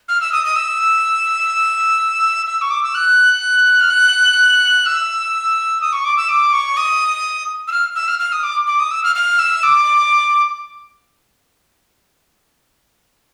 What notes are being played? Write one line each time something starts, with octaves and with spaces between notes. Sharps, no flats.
F6
E6
D#6
D#6
E6
E6
C#6
D6
E6
F#6
F6
F#6
E6
D#6
C#6
D6
E6
D6
C#6
D#6
E6
F6
E6
F6
F6
D#6
D6
D6
D#6
E6
F6
F6
E6
D6